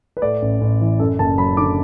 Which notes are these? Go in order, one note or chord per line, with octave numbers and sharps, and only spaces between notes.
B4
A2 D5
A1
A1
E3
F#2 A4
F#1 A5
F#3 B5
D3 D6